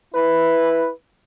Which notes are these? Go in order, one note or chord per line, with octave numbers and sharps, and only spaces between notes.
E4 B4